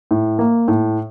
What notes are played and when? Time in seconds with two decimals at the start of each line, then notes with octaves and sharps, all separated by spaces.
0.11 A2
0.39 A#3
0.68 A2